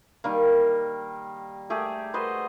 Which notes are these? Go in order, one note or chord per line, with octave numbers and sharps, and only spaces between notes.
D#3 G3 A#3
A3 G4 G#4
F#4 B4 C5 D#5